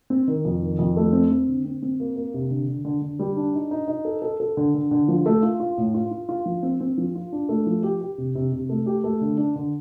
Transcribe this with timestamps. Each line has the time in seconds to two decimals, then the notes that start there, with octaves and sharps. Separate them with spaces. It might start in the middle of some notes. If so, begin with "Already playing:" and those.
0.10 C4
0.28 D#3
0.45 F2
0.62 D#3
0.79 F2
0.97 A3
1.13 C4
1.31 C4
1.48 D3
1.65 C4
1.82 C4
2.00 A#3
2.16 A#3
2.34 C3
2.50 D3
2.68 D3
2.85 D3
3.02 D3
3.19 G3
3.37 D4
3.54 D#4
3.71 D#4
3.88 D#4
4.05 A4
4.22 A4
4.40 A4
4.57 D3
4.74 D3
4.91 D3
5.08 F3
5.26 A3
5.43 F4
5.60 F4
5.77 A2
5.94 F4
6.11 F4
6.29 F4
6.46 F3
6.63 C4
6.80 C4
6.98 F3
7.15 F4
7.32 D4
7.49 A3
7.66 F3
7.83 G4
8.01 G4
8.18 C3
8.35 C3
8.52 C3
8.69 A3
8.86 G4
9.04 A3
9.21 D3
9.37 D4
9.56 D3